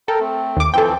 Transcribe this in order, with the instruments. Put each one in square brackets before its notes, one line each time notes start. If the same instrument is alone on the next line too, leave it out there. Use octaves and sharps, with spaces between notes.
[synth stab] A4 [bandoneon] A#4 G5 A#5
[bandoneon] A3 C4
[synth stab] D#2 D6
[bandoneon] E3 F3 C4 [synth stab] A4 G5